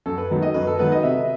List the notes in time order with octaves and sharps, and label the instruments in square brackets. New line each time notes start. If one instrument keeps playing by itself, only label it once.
[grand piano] F#2 A4
B4
D#3 F#3 B3
D#5
F#2 B4
A4
D#3 F#3 B3 B4
D#5
C3 E5